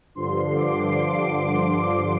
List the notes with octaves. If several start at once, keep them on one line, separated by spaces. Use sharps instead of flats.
G2 D3 F3 C6
D6